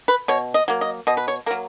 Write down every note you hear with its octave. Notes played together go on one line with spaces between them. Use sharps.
B4
B2 C#5
D#5
F#3 A#3
D#5
B2 D#5
B4
C#5
F#3 A#3 A#4